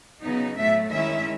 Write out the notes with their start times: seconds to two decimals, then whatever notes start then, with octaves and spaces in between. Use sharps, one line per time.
0.22 C#3 F#3 B3 D#4
0.57 A2 F#3 A3 E5
0.91 D#3 G#3 C#4 E4 E5